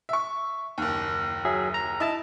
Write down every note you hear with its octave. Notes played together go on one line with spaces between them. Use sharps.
E5 C#6
F#1 D#2
F#3 G#4 E5
A#5
E4 D#5 A5 A6